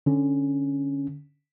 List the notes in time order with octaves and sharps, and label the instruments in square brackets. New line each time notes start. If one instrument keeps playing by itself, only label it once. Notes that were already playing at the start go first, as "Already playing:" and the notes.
[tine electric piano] D3 C#4